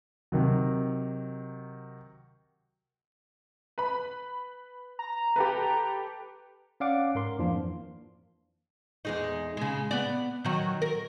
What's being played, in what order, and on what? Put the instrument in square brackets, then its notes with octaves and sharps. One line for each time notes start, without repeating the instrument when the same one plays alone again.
[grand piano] C3 D#3 F#3
[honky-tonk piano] B4 B5
[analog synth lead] A#5
[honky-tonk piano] G4 A4 B4
[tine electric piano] C#4 D5 F5 F#5 D6
G#2 A#4 C6
F2 E3 F3 A#3 D4 F4
[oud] E2 G#3 D#4
C#3 G#3
B3 D5
D#3 F#3
A#4